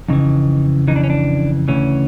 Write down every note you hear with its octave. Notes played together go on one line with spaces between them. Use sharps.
F2 C#3 E3 D#4
F2 C#3 E3 D#4
D4
C#4
D4
D2 C#3 E3 C#4